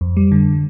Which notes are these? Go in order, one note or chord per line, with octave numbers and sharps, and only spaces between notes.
F2
G3
D3